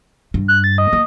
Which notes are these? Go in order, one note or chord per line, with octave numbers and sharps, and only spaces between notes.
G2
F#6
A6
D#5
A#3